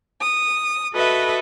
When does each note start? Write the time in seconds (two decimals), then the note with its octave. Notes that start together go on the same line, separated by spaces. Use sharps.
0.21 D#6
0.93 F#4 A4 B4 D#5 E5